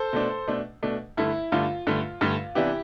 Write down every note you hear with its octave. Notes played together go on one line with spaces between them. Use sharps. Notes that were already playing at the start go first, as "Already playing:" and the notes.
Already playing: A4 C5
B2 A3 D4
B2 A3 D4
B2 A3 D4
G2 D3 A3 E4
G2 D3 A3 F4
G2 D3 A3
G2 D3 A3
C3 E3 B3 D4 E4 G4